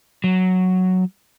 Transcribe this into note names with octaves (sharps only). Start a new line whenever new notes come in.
F#3